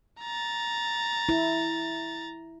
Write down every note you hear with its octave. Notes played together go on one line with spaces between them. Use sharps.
A#5 A6
E4